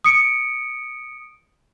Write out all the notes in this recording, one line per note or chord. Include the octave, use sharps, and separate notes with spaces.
D#6 C#7 D7